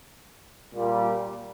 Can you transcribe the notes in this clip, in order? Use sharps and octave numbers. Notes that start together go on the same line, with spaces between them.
A#2 G3